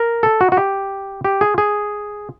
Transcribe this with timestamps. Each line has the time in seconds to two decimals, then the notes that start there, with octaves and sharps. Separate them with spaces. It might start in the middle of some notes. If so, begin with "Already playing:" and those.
Already playing: A#4
0.23 A4
0.41 F#4
0.52 F#4
0.57 G4
1.25 G4
1.41 G#4
1.58 G#4